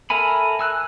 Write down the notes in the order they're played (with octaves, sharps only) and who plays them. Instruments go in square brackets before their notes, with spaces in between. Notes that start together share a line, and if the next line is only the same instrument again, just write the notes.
[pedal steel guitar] A4 A#4 E5 G#5 B5
G#5 E6 F#6